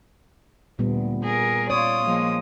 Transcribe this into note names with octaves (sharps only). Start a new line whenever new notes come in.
D2 A#2 G3 B3
G#4 A#4
F4 C#5 D5 D#6
F3 G#3 A#3